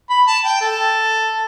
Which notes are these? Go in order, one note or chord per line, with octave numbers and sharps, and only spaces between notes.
B5
A5
G5
A4